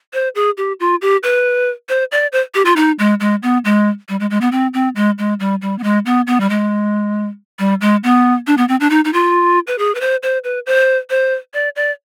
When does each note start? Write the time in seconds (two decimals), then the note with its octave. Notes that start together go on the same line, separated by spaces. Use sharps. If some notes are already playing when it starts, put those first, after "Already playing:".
0.13 C5
0.35 G#4
0.57 G4
0.80 F4
1.02 G4
1.23 B4
1.89 C5
2.12 D5
2.32 C5
2.54 G4
2.65 F4
2.76 D#4
2.99 G#3
3.20 G#3
3.43 B3
3.65 G#3
4.09 G3
4.20 G#3
4.30 G#3
4.41 B3
4.52 C4
4.74 C4
4.96 G#3
5.18 G#3
5.40 G3
5.62 G3
5.79 B3
5.83 G#3
6.06 B3
6.27 B3
6.40 G3
6.50 G#3
7.59 G3
7.81 G#3
8.04 B3
8.47 D4
8.57 B3
8.68 C4
8.80 D4
8.90 D#4
9.05 D#4
9.13 F4
9.67 B4
9.78 G#4
9.95 B4
10.01 C5
10.23 C5
10.44 B4
10.66 C5
11.10 C5
11.54 D5
11.76 D5